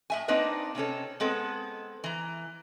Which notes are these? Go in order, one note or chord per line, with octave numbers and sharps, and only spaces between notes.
A2 E5 G#5
A#3 C4 D4 D#4 B4 D#5
C3 C4 C#4 A4
G#3 B3 C4 A4
E3 A#5